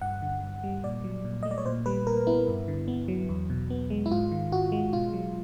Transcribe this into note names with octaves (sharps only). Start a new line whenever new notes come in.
G2 F#5
D3
G2
G3
A#2 D5
F#3
A#2
D#5
A3
D5
C#5
A#2 C5
G3 B4
A#2 A#4
B3 E4
G2
D3
B3
F#3
E2
B2
B3
G#3
E4
G#2 F4
D#3
G#2 F#4
G#3
B2 F4
F#3